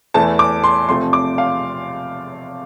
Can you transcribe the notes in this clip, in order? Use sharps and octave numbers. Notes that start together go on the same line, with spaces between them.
E2 E3 A3 A5
D6
C6
C3 F3 A3 C4 C6
D6
F5